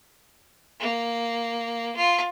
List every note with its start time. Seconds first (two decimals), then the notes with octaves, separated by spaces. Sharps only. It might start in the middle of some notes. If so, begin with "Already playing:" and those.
0.80 A#3
1.96 F4